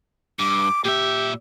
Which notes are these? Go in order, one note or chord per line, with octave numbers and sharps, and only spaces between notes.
G2 D6
A#2 G4 E5